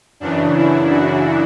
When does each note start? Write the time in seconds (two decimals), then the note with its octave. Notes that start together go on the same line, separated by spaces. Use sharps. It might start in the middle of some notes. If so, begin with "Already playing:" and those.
0.20 F#2 C#3 E3 D4
0.55 E4
0.90 F#4